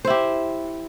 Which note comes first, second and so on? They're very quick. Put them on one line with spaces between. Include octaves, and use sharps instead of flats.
C5 E4 G4